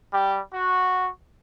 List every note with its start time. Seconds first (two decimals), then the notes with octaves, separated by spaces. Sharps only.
0.11 G3 G4
0.53 F#4